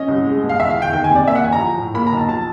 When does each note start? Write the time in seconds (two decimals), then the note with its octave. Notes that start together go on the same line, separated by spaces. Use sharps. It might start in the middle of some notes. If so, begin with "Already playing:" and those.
Already playing: C#4 D#5
0.08 C2
0.25 G#3
0.43 B2
0.49 F5
0.59 E2 E5
0.70 F5
0.76 E2
0.82 G5
0.93 D#3 G5
1.04 G#5
1.10 C3
1.16 D5
1.27 A#3 E5
1.35 F#5
1.44 A1 G#5
1.53 A#5
1.61 F3
1.78 A2
1.94 A#3 B5
2.07 A#5
2.12 B1
2.17 A5
2.29 F3 A5